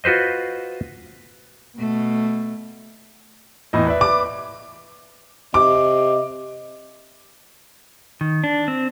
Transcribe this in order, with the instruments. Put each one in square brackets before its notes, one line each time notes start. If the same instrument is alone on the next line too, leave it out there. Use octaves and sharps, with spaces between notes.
[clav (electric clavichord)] F4 F#4 B4 C5 D#5
[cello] B2 A3
[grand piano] E2 A2 D#5
B4 D5 E5
[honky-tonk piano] D6
[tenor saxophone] C3 [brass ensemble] D#5 [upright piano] D6
[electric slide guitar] D#3
D4
C4